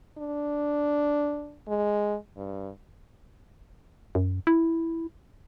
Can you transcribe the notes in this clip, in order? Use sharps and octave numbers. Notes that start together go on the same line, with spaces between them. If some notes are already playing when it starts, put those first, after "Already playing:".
D4
G#3
G2
F#2
E4